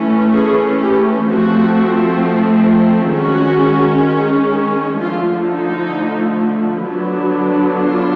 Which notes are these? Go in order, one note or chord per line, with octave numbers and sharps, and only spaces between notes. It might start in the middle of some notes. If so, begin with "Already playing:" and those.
Already playing: E3 A3 C#4
G#4
G4
F3 A3 C4 F#4
D#3 G#3 C#4 F#4
D3 F3 A3 F4
D#4
D3 F#3 B3 D4
F4